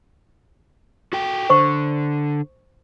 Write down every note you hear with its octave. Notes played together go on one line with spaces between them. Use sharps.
F#4 A4 G5
D3 C5 C#6